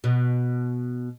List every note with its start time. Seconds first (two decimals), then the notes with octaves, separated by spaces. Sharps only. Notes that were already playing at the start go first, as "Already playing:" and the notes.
0.04 B2